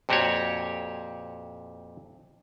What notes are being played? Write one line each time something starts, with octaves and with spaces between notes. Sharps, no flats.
F2 A#2 F#4 G4 C5 C#5